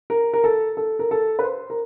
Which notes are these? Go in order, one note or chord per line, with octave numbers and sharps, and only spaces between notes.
A#4
A#4
A4
A4
A#4
A4
B4
C5
A#4